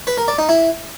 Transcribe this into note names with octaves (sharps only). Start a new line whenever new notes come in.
B4
A#4
D5
D#4
E4